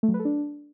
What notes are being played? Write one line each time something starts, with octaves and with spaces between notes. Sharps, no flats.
A3
F#3
B4
A4
D4